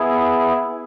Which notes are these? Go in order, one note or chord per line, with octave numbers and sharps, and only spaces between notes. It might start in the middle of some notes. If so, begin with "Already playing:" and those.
Already playing: B3 E4 G#4